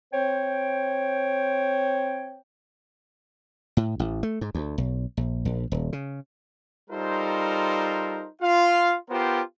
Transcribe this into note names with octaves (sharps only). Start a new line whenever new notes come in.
C4 C5 C#5 G5
A2
A1
A3
G#2
D2
B1
A#1
A#1
D#1
C#3
G3 D#4 F4 A4 A#4 C5
F4 F5
B3 F4 G4 A#4 C5